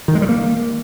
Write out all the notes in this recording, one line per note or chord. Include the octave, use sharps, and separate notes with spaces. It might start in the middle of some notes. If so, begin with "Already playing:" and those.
D#3
G#3
G3
A#3